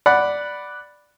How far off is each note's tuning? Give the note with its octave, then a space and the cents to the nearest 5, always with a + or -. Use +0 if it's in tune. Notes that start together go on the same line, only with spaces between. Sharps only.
D5 +0 F#5 +0 B5 +0